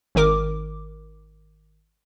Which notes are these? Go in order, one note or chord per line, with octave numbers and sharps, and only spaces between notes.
G#1 D#3 A#4 D6